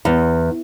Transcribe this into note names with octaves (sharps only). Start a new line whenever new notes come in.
E2